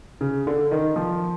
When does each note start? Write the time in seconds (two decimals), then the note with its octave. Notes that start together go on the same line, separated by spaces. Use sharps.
0.21 C#3
0.47 D3
0.71 D#3
0.96 F3